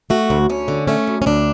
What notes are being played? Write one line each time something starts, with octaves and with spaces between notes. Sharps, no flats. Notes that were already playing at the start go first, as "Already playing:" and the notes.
A3 F#4
D2
D2 C#4
D3
A3 C#4
D2
C#4
D2 D4